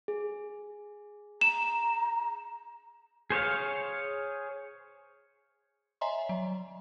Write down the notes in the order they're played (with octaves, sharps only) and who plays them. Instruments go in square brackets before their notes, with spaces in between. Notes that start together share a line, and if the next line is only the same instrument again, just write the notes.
[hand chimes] G#4
[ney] A#5 [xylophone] E7
[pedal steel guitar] G#4 C5 C#5 F5
[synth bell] C#5 D#5 E5 G#5 A#5 C6
F#3